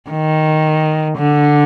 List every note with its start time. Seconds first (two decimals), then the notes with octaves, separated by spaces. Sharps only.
0.10 D#3
1.18 D3